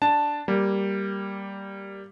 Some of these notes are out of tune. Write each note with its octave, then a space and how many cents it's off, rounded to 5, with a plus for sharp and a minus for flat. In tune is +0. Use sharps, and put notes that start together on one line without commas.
D4 +0 A5 +0
G3 +0 A#3 +0